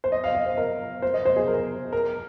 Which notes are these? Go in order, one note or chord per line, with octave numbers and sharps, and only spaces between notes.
C5
D#5
F5
D#5
C5
A#4
C5
D#5
C5
G#4
A#4
A#4